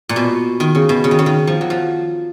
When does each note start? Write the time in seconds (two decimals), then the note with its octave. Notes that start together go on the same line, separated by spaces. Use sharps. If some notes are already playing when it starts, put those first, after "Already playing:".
0.09 A#2
0.16 B2
0.60 D#3
0.75 C#3
0.89 B2
1.04 C#3
1.11 D#3
1.19 C#3
1.26 D#3
1.47 F3
1.61 F#3
1.70 F3